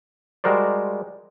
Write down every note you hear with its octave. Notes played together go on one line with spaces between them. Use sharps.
G3 G#3 F#4 A#4 C5 D5